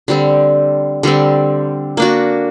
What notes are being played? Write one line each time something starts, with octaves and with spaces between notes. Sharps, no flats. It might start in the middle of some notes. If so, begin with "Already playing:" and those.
D3 G3 C4
D3 G3 C4
A#3 D4 F#4